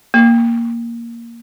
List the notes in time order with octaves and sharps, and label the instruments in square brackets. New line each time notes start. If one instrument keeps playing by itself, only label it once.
[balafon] A#3